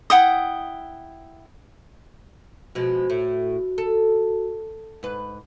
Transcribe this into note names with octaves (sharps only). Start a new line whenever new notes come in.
E4 F#5 G5 D#6
B2 F3 G#3 F#4
A2
A4
G#2 B4